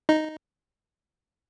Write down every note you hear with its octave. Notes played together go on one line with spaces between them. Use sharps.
D#4